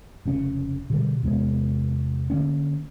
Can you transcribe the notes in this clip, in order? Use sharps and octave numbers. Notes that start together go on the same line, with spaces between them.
F1 C#3 C4 C#4
B2 D3 G3
E2 C3 G#3 B3
D3 E3 A#3 C#4